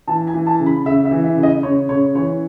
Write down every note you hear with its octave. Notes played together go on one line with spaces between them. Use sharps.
E3 A5
G#5
E3
A5
C#3
B5
C#3 E5
E5
E3
E5
C#3
D#5
C#3 C#5
C#3 C#5
E3 C#5